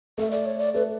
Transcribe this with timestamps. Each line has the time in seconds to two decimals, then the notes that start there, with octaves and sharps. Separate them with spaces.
0.18 A3 E5
0.31 D5
0.46 C#5
0.59 D5
0.74 A3 B4